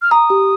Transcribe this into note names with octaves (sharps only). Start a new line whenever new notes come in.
F6
A#5 D#6
G4